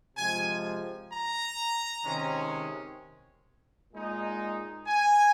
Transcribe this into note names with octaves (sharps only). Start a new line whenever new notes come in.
C3 F3 G#3 G#5
A#5
C3 D#3 G#3 C#4
A#2 G#3 D#4
G#5